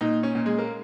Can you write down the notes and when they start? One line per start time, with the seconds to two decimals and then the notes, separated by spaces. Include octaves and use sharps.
0.01 A#2 D#4
0.23 C#4
0.35 A#2
0.46 G#3
0.59 A#3